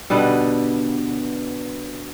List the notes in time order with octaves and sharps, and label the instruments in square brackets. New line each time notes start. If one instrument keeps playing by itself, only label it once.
[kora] B2 D3 G3 B3